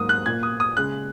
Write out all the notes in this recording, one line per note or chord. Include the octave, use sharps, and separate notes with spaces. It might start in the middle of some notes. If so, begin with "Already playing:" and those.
Already playing: G#2 F#3 A#3 D#6
F#6
A#2 A#3 G#6
D#6
D#6
C#3 G#3 F#6